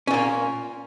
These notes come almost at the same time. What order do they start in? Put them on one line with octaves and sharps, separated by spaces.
C#4 A#2 A#3